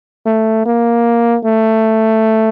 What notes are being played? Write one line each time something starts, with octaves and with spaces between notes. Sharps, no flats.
A3
A#3
A3